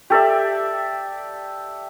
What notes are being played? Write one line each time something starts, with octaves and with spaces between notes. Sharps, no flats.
G4 A4 D5 E5